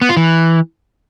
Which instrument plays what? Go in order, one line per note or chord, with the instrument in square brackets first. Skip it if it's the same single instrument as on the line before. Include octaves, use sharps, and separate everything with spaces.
[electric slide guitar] B3
F4
E3